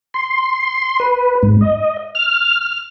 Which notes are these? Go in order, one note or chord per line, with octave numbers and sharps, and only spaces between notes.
C6
B4
G#2
D#5
F6